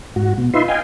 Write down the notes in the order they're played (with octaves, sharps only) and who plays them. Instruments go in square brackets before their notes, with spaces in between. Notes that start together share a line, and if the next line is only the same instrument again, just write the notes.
[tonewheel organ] G#2 F#4
B2
D#4 F4 B4 E5 C6
D#5 F5 G5 G#5